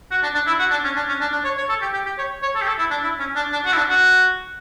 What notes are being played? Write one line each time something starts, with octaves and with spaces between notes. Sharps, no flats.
F#4
D4
D4
E4
F#4
D4
C#4
D4
C#4
D4
D4
C#5
C#5
A4
G4
G4
G4
C#5
C#5
A4
G4
A4
E4
D4
E4
C#4
D4
D4
F#4
E4
D4
F#4